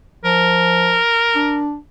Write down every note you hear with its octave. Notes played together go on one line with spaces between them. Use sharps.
F3 A#4
D4